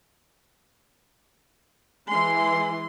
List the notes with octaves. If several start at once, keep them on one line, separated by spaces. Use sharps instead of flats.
E3 G#3 G#5 C6